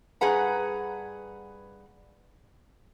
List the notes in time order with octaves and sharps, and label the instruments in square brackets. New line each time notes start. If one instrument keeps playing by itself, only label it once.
[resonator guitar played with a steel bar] G2 G#4 B4 F#5 A#5